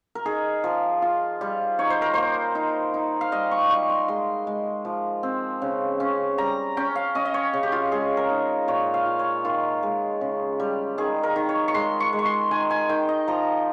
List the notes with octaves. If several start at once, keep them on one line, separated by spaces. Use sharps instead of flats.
A#4
D#4 G#4
F3
F4
G3
D#4 C#5
C5
A#4
A#3 C5
D#4
D#4
F5
G3 D#5
C#6
G3 C#6
C6
G#3 C6
G#3
F3
C4
C#3
C#4
G3 A#5
C#4 G5
F5
C#4 D#5
D#5
C#5
C#3
G4
F4
G#3 G#4
A#4
D#4
A#2 C#5
F5
F4
C#5
D#3 F4
G#3
C#3
G3
D#3 G#4
A#4
D#3
C#5
C#6
G#3 C6
C#6
G#3
C#6
C6
D#3 G#5
G#5
D#3 G5
D#5
F3 A#5